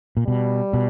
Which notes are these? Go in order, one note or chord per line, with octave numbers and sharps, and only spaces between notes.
A#2
B2 G3
B2